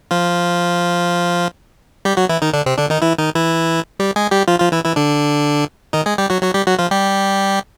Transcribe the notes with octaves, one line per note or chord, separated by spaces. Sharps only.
F3 F4
G3 G4
F#3 F#4
E3 E4
D#3 D#4
D3 D4
C3 C4
D3 D4
D#3 D#4
E3 E4
D#3 D#4
E3 E4
G3 G4
G#3 G#4
G3 G4
F3 F4
F3 F4
E3 E4
E3 E4
D3 D4
D#3 D#4
G#3 G#4
G3 G4
F#3 F#4
F#3 F#4
G3 G4
F#3 F#4
F3 F4
G3 G4